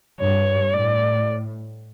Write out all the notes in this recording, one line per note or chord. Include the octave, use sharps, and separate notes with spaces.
G2 C#5
A2 D5